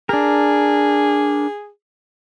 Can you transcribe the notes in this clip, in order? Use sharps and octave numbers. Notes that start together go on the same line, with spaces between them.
D4 G#4 A#4